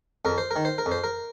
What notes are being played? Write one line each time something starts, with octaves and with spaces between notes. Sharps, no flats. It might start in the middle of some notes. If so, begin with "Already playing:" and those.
F2 A#4
C5
A#4
D#3
C5
A#4
F2
C5
A#4